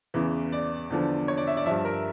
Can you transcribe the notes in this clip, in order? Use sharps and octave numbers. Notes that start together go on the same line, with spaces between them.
E2 C#3 E3
D5
E2 D3 F3
C#5
D5
E5
D5
G2 F3 E5
A#4